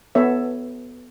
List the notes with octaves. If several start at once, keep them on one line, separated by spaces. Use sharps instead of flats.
B3 A4 C#5 E5